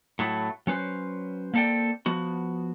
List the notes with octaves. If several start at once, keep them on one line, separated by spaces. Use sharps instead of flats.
A2 F#3 A3 E4
F#3 C#4 B4 C5
A#3 C4 A4 D5 G5
F3 B3 F#4